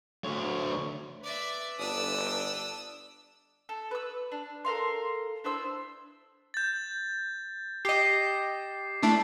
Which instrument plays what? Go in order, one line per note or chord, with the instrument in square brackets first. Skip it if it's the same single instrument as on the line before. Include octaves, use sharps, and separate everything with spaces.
[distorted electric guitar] D2 C#5
[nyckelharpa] B4 D6 [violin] D5 E5
[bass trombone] G1 [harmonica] D4 [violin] D#6 E6
[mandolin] A4
B4 E6
D4
A4 A#4 F5 C6
D4 E4 C5 E6
[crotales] G6 A6
[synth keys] G4 D#5 [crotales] D6 C7
[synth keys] A3 D4 E4